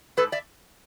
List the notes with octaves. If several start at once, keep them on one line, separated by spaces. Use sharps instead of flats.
G#2 A4 B4
D5 E5